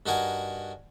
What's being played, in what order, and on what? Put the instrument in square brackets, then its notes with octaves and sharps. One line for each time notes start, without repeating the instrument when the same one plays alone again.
[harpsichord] G2 D#4 F#4 A#4 F#5 G#5